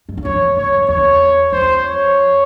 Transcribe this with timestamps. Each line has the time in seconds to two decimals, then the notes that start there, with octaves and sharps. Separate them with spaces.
0.09 G2
0.17 F#2
0.24 F2 C#5
0.36 E2
0.57 F#2 C#5
0.72 F2
0.89 E2 C#5
1.52 F2 C5
1.84 C#5